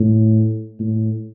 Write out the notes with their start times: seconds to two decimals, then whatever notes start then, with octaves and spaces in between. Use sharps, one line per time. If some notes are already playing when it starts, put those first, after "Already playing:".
Already playing: A2
0.80 A2